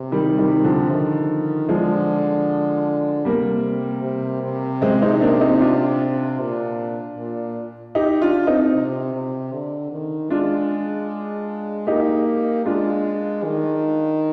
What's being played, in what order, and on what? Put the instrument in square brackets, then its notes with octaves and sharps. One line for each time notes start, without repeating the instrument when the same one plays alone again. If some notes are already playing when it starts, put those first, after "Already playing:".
Already playing: [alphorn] C3
[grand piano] D#3 G3
D#3 G3
D3 F3
[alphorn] D#3
[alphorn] D3 [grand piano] F3 G#3
[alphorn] C3 [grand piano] G3 A#3
[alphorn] C3
C3
[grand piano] G#3 C4
C4 D#4
A#3 D4
C4 D#4
D4 F4
[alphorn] A#2
A#2
[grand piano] D#4 G4
D4 F4
C4 D#4
[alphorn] C3
C3
D3
D#3
[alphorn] G#3 [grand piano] D4 F4
[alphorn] A#3 [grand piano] D#4 G4
[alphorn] G#3 [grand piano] D4 F4
[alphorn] D#3